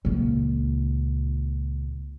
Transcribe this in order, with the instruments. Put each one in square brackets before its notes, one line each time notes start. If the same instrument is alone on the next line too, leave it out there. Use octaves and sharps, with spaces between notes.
[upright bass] C#2 A#2